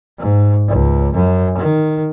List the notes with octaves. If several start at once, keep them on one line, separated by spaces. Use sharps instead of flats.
G#2
C#2
F#2
D#3